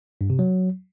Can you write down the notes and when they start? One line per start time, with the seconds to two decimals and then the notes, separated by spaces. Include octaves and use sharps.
0.21 G2
0.30 C3
0.39 F#3